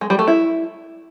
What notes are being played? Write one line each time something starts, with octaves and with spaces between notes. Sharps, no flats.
G#3
G3
A3
E4